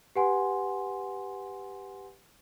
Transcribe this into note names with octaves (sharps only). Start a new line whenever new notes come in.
G4 B4 F#5 G#5 C6